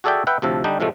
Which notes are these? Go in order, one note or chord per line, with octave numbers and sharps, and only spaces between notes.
F#4 G#4 A4 D5 E5 G5
B4 E5 F#5 G5
D2 A2 C3 F3 A4
D3 G3 D4 D#4 G4
A2 C3 F3 G#3 A3